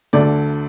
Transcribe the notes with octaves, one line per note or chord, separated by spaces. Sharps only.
D2 D3 A3 D5